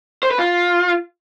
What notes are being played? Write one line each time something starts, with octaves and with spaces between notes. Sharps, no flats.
C5
B4
F4